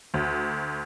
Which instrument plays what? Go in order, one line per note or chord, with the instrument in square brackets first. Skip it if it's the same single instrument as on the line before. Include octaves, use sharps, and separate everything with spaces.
[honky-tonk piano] D2